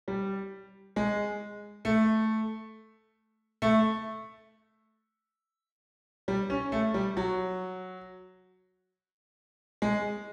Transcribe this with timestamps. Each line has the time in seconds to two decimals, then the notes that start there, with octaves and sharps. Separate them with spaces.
0.08 G3
0.96 G#3
1.85 A3
3.62 A3
6.28 G3
6.50 C#4
6.72 A3
6.94 G3
7.17 F#3
9.82 G#3